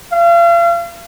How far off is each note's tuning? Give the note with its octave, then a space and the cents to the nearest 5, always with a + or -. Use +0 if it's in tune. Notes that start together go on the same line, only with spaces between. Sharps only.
F5 -40